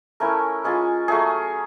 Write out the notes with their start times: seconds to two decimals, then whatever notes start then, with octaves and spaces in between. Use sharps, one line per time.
0.20 A3 C#4 E4 A#4
0.64 G#3 C#4 F4
1.08 F#3 A3 C#4 G#4